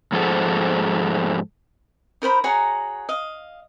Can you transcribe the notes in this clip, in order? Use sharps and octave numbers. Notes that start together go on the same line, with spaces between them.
G#2 F3 G#4 A4 C5 F#5
D#4 A#4 C5 B5
F#4 G#4 C#5 A#5
D#5 F5